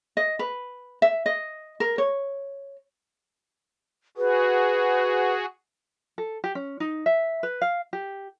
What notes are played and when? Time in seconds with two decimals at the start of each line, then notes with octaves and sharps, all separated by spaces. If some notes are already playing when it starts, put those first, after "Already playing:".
0.17 D#5
0.39 B4
1.02 E5
1.26 D#5
1.80 A#4
1.98 C#5
4.17 F#4 G#4 B4
6.18 A4
6.44 G4
6.55 C#4
6.80 D#4
7.06 E5
7.43 B4
7.61 F5
7.93 G4